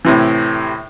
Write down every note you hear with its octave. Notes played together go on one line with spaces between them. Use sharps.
A2 C3 E3